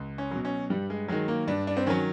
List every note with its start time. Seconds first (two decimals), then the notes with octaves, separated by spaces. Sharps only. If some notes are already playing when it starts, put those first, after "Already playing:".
Already playing: C#2
0.18 C#4
0.31 B2 F#3
0.45 C#4
0.70 G2 G3
0.90 G#3
1.08 D#3 F#3 G#3
1.28 A#3
1.47 G2 D4
1.67 D4
1.77 C4
1.86 D#3 F#3 C#4